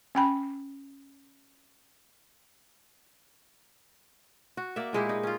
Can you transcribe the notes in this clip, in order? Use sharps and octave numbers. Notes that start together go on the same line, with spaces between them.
C#4 G5 B5
F#4
A#3 D5 E5
A#2 G#3 E4 G4
D#4
C#4 F4